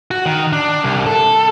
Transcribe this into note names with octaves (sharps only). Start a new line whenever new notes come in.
F#4
D#3
D4
C2
A4